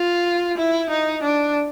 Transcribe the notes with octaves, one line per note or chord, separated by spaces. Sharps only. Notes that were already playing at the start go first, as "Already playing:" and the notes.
Already playing: F4
E4
D#4
D4